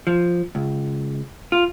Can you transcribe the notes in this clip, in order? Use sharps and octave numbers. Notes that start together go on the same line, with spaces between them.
F3
C#2
F4